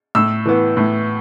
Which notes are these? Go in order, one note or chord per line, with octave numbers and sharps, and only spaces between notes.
A2 E6
E3 B3
A2